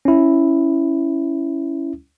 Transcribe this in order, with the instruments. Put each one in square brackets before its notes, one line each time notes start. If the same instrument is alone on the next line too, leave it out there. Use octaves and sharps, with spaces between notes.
[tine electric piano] C#4 E4